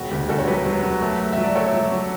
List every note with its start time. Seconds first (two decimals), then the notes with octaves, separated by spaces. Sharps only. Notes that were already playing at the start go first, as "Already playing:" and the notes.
Already playing: E1 F#4
0.11 D2 G4
0.29 D2 F#4 A4
0.39 C#5
0.47 F#3 G4 B4
0.66 F#3
0.83 F#3
1.01 A3
1.19 A3
1.33 F#3 E5
1.44 D5
1.55 A3 A4 C#5
1.73 F#3
1.92 F#3